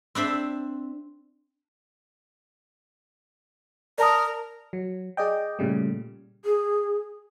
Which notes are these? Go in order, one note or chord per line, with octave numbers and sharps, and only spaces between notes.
C4 D4 C5 E5
A#4 D5 A5 D#6
F#3
G#4 D5 D#5 G5
A#2 C#3 G3 A3
G#4